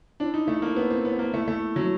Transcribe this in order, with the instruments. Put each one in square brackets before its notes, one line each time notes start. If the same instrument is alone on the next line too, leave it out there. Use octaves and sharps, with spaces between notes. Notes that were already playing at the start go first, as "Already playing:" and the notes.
[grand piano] D4 [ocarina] E4
[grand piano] D#4
A3
A#3
B3
C4
B3
A#3
[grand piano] A3 [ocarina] E4
[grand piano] A3
F#3